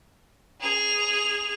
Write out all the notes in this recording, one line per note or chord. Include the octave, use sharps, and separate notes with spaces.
G#4 F7